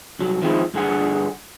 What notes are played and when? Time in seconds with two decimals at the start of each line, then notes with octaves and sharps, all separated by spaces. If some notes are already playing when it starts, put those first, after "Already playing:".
0.19 C2 F#3
0.42 D#3 F3 G#3 C4 E4
0.74 G2 D3 G#4 F#5